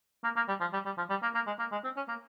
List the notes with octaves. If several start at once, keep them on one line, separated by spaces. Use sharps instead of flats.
A#3
A#3
G3
F3
G3
G3
F3
G3
A#3
A#3
G#3
A#3
G#3
C4
C#4
A#3